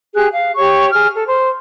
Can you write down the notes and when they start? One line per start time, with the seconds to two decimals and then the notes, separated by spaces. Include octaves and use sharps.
0.15 G4 G#4 F#6
0.33 F5
0.56 G4 C#5 C#6
0.93 G#4 F6
1.13 A4
1.26 C5